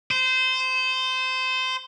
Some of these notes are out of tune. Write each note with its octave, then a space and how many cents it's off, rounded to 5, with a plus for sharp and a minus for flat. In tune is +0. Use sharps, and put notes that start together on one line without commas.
C5 -20